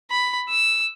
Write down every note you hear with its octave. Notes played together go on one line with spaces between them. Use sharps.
B5
E6